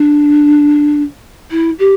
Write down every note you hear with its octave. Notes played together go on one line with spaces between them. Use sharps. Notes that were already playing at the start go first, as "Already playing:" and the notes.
Already playing: D4
E4
G4